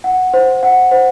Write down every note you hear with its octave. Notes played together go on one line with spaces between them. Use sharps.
F#5
C5
F#5
C5